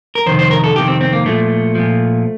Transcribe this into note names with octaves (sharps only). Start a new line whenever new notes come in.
A#4
F2 C3 D#3 C5
C5
A#4
A4
F2 C3 D#3 G4
C4
C4
A#3
A#2 F3 A3
A#2 F3